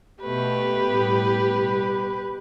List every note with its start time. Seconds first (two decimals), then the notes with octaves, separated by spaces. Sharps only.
0.23 B2 A3 G4 B4
0.86 A2 G3 B3
1.48 B2 G3 B3